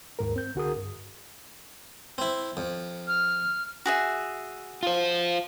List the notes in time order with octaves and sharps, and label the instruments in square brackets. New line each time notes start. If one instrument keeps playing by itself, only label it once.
[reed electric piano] D#2 G#2 A#4
C4 G6
C2 D3 F#4 G#4 A#4 D#6
G2
[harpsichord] C4 E4
F2
[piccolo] F6
[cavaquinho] F#4 G#4 E5
[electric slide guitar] F4 C5